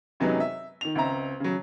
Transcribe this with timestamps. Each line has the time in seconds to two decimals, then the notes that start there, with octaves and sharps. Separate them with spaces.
0.20 F#2 C3 F#3 G#3 B3 D#4
0.40 E5
0.81 D#3 F7
0.95 C#2 C4 E5 A#5
1.40 C#3 F#3